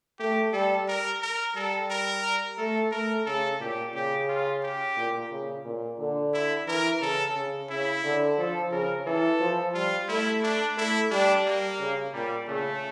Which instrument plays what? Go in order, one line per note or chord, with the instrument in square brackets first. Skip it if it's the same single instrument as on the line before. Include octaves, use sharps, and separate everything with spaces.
[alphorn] A3 [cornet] G4
[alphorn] G3 [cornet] A4
[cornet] A#4
A#4
[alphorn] G3 [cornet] A4
[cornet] A#4
[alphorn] A3 [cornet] A4
[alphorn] A3 [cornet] A#4
[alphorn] C#3 [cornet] A4
[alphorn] A#2 [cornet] G4
[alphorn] C#3 [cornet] G4
[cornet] F4
G4
[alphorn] A#2
C#3
A#2
D3
[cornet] E4
[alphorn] E3 [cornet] A#4
[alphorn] C#3 [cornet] A4
[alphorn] C#3
[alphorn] C#3 [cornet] E4
[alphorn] D3
[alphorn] F3 [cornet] A4
[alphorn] C#3 [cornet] A#4
[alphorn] E3 [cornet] A4
[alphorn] F3
[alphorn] G3 [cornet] F4
[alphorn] A3 [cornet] E4
[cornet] D4
[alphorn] A3 [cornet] E4
[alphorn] G3 [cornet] D4
[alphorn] G3 [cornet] A#3
[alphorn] C#3
[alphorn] A#2 [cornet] G3
[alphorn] C#3 [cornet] A3